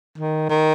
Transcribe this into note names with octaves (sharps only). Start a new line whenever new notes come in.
D#3
D#3